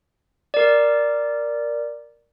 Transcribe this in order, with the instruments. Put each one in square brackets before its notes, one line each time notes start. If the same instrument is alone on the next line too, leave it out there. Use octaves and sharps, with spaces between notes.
[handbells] A#4 D5